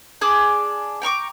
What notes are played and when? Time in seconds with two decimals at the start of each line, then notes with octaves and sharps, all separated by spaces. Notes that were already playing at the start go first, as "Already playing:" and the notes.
0.21 D4 G#4 D6 E6
1.02 G5 A#5 C#6 D6